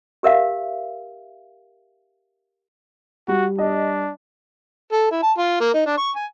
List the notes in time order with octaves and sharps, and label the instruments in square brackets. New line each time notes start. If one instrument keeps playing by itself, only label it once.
[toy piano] G4 A#4 E5 F5
[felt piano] G3 [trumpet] F#4
[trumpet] D4 [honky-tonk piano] D#5
[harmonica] A4
E4
A5
F4
A#3
D#4
D4
C#6
G#5